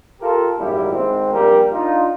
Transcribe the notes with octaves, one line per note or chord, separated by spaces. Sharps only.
F4 G4 A4 A#4
G#1 F#2 G3 A#3 E4
G#1 G#2 G#3 C4
A#1 A#2 G3 A#4
D4 D#4 F4